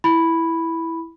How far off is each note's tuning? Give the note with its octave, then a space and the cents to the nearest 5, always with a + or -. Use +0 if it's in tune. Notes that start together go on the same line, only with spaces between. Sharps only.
E4 +0 B5 +0